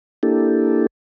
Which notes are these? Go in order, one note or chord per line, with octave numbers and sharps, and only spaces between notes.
A#3 D4 E4 G4 A4